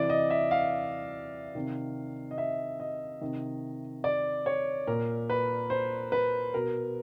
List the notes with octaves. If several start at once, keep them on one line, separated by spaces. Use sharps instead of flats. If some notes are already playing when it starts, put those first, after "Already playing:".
Already playing: C3 E3 D5
D#5
E5
F5
C3 D#3
D#5
E5
D#5
C3 D#3
D5
C#5
A#2 A#4
B4
C5
B4
B2 A#4